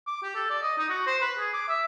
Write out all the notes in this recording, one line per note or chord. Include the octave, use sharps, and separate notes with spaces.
D6
G4
A4
D5
D#5
D#4
F#4
C5
B4
G#4
D6
E5